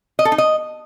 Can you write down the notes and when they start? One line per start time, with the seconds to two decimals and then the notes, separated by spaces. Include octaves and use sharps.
0.19 D#5
0.25 A4
0.32 D#4
0.38 D#5